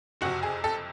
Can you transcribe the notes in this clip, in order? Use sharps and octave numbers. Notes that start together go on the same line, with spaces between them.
F#1 F2 C3 F#4
G#4
A4